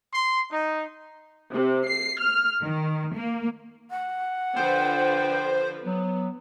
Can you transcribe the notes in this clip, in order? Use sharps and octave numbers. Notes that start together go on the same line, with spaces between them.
C6
D#4
C3
C7
F6
D#3
A#3
F#5
D3 F3 B4 C5 G5
F#3 B3